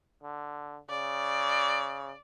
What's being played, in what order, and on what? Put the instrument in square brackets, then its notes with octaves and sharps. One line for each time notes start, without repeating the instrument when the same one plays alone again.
[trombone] D3
[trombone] C#3 [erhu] D5